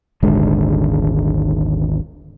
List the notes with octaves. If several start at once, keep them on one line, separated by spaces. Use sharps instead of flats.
D#1 G#1 D3 G#3